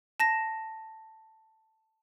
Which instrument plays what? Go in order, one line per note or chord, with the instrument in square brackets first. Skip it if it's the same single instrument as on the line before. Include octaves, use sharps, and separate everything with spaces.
[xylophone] A5 A#6 E7